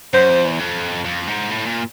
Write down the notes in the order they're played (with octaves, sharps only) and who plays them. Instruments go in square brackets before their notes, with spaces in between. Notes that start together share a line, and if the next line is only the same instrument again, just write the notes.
[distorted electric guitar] F#2 [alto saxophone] C5
[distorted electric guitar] F2
E2
F2
F2
G#2
A2
A#2